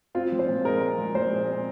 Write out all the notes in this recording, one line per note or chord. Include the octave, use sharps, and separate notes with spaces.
C4 F4
F3
C5
A#2
G#3 A#4
C4
F3
A#2 C5
G#3
C4